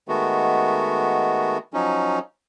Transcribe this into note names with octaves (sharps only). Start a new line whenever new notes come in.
D#3 G#3 A3 B3 F#4
F3 F#3 C#4 D#4